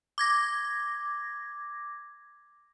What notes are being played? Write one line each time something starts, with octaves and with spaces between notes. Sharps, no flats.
D6 G#6 A#6